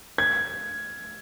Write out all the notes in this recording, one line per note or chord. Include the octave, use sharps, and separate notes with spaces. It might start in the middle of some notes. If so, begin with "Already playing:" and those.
G#6